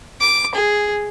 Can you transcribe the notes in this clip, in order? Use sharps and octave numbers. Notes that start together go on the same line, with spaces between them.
D6
G#4